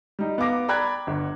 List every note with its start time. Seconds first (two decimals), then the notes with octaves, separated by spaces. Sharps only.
0.19 G3 D#4
0.38 B3 F5 D6 A#6
0.68 D5 G5 A#5 B5 F#6 G#6
1.07 G1